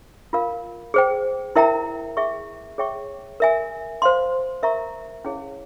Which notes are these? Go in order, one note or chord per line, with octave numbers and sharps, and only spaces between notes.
F4 A#4 F5
G#4 C5 G5
E4 A#4 E5 G5 A#5
G#4 E5 G5 C#6
G#4 C#5 E5 G5 C#6
A#4 E5 G#5
C5 F5 C6
A#4 E5 A#5 C#6
C#4 E4 G#4 C#5 F5